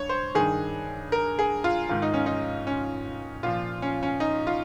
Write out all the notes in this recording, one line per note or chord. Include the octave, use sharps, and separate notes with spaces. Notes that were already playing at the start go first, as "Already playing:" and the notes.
Already playing: G2 C#5
C5
G2 D#3 G#4
A#4
G#4
F4
G#2 D#3 F4
D#4
C#4
D#4
C#4
A#2 F3 F4
C#4
C#4
D#4
F4